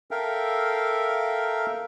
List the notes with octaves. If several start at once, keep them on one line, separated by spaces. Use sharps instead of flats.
A4 A#4 E5 F5 G5